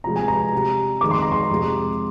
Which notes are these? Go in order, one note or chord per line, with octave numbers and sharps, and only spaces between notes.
C3 F3 G#3 A#5
G#5
A#5
C3 G3
F2 D#3 G#3 D6
C6
A#5
C6
F2 C3 F3 G#3